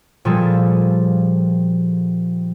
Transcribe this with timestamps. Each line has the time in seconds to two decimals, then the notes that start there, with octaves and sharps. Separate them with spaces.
0.25 A#2 F3 G3 G#4 A4